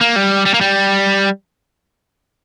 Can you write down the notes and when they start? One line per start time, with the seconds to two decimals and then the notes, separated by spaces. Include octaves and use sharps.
0.01 A#3
0.16 G3
0.46 G3
0.54 A#3
0.61 G3